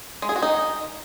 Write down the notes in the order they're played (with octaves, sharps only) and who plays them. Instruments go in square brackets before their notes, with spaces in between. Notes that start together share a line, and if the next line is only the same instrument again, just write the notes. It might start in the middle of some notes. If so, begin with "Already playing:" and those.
[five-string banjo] G#3
G#4
F#4
D#4